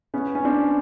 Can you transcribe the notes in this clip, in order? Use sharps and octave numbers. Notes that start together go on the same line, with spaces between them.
B3 C#4
C#4
C4 D4